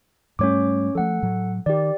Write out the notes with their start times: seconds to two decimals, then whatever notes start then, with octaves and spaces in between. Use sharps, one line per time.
0.39 G#2 G3 A3 C#4 C#5 D6
0.95 F3 A3 A4 F#5
1.22 A2 F#3
1.66 D#3 G4 D5